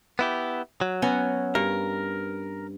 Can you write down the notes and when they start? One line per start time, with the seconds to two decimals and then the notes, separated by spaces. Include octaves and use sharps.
0.19 B3 E4 G4
0.81 F#3
1.02 B3 C#4 F#4
1.55 G2 A#4